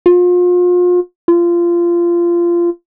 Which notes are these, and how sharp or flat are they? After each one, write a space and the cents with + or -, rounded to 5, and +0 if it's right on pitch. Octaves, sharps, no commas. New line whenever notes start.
F4 +35
F4 -20